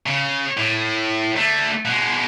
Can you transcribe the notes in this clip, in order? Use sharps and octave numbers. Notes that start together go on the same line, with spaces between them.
C#3
A2
D3 A3
B2 G#3